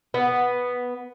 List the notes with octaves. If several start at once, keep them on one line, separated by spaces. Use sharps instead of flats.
B3